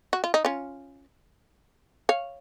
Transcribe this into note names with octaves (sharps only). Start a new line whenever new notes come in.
F#4
F4
D#4
C#4 F4
C#5 F5